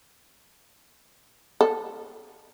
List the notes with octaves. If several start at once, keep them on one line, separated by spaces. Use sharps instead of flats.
A4